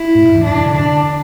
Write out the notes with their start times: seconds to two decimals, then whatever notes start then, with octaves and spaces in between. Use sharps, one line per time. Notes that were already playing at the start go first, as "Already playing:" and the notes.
Already playing: E4
0.15 A2
0.25 G#2
0.35 E2
0.44 F#2 D4
0.55 B2
0.64 C#3
0.74 D3 D4